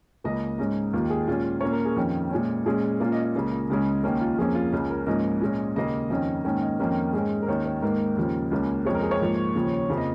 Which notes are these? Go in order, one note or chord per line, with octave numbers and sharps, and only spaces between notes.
C#2 C#3 A#3 D#5
G#2 G#3 C#4 D#4
D#2 D#3 A#3 F4
G#4
A#2 G#3 C#4 F4
A#2 A#3 C#4 C#5
A#4
G#4
F2 D#3 C#4 F4
A#2 G#3 C#4
A#2 G#3 C#4 G#4
A#2 A#3 C#4 F4
D#5
D#5
C#2 C#3 A#3 C#4
C#2 C#3 G#3 C#4
D#2 D#3 A#3 C#4 A#4
F4
F2 F3 A#3 C#4 G#4
F4
C#2 C#3 G#3 C#4 G#4
A#4
G#2 F3 A#3 C#4 D#5
A#2 G#3 C#4
D#2 C#3 A#3 D#5
F2 D#3 C#4 D#5
G#2 D#3 A#3 C#4
D#5
F2 D#3 A#3 C#4 A#4
G#2 G#3 C#4 G#4
A#4
D#2 D#3 C#4 C#5
C#5
G#2 D#3 A#3 A#4
D#2 C#3 F3 C#4
C#2 C#3 A#3 C#4
F2 F3 G#3 C#5
A#4
G#4
C#5
G#2 F3 A#3
D#2 C#3 F3
F2 C#3 F3 A#3
D#5